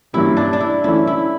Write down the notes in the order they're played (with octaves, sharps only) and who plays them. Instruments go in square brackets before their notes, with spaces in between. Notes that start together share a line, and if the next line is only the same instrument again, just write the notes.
[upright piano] G2 E3 A#3 C#4 G4 [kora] E4
[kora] D4
D4
E4
[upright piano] E3 A3 C#4 [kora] E4
[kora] E4